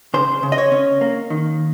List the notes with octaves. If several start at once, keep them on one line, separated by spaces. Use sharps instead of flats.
C#3 C5
C#3
D#5
C#5
C#4
A#3
D#3